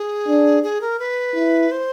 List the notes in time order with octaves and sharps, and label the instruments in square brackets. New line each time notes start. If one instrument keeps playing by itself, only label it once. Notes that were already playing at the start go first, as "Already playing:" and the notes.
Already playing: [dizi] G#4
[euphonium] D4
[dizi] G#4
A#4
B4
[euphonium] E4
[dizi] C5